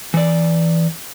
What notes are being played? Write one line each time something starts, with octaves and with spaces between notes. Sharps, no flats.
E3 D5